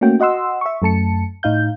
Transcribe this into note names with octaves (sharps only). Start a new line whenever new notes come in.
A3 A#3 C#4 F#4 G5
F#4 D#5 F#5 C6 E6
E5 C#6
F#2 A3 A5 C#7
A2 D#4 F5 G6